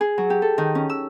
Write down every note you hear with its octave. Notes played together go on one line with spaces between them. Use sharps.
G#4
F#3
G4
A4
D#3
C#4
E6